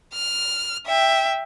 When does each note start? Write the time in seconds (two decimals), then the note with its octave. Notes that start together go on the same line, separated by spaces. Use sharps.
0.14 F6
0.87 E5 G5